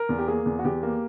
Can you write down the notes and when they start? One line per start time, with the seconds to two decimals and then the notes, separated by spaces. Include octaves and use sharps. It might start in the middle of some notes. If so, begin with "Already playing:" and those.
Already playing: A#4
0.09 E2
0.19 G4
0.27 A#3 G#4
0.46 E2
0.59 F#4
0.64 E2 G4
0.83 A#3